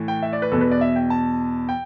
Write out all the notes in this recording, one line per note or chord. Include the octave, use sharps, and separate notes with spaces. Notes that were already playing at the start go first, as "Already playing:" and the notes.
Already playing: A2 E3
G5
E5
D5
B4
E2 B2 A4
B4
D5
E5
G5
A5
G5